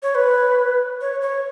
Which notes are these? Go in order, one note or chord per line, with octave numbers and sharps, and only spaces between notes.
C#5
B4
C#5
C#5